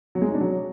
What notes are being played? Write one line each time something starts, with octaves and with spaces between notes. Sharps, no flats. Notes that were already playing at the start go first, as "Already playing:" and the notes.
F#3
G#3
D#4
D4
F#3